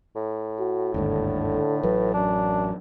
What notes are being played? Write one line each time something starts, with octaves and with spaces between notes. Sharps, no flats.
A2
F#4
G1 D#2 G#2 D3
A1 F#3 B4
F#2 D4